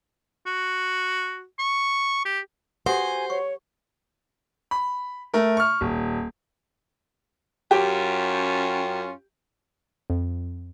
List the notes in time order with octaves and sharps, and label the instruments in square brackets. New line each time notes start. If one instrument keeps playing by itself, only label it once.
[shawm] F#4
C#6
G4
[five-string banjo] F#4 [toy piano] G4 A4 F#5 [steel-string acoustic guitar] C5 [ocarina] G#5
[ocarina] C#5 [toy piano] C#6
[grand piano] B5
A3 A#4
C#6 F6
D#1
[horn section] F#2 C#4 F4 [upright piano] G4
[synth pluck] F2